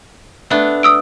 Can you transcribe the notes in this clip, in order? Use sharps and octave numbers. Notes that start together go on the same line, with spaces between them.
A3 B3 D4
D#6 E6 D7